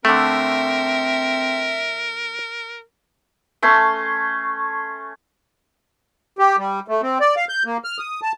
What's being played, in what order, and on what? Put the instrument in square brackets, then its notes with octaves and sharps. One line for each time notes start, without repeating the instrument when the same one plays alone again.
[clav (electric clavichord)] D3 A3 [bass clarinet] C4 [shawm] A#4 [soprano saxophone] E5
[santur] A3 C#4 A5 C6
[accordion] G4
G3
A3
C4
D5
F5
G6
A#3
F6
D#6
A5